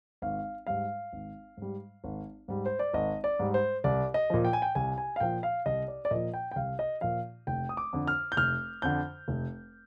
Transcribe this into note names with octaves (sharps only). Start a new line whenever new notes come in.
G#1 F5
G#2 G3 F5
G#1
G#2 G3
G#1
G#2 G3
C5
D5
G#1 D#5
D5
G#2 G3
C5
C2 D5
D#5
A#2 F3
G5
G#5
G5
C2 G#5
G#5
F5
A#2 F3 G5
F5
C2 D#5
D5
D5
A#2 F3 D#5
G5
G5
C2 F5
D#5
A#2 F3 F5
F1 G5
D#6
D6
F2 D3
F6
G6
F1 F6
F2 D3 G6
F1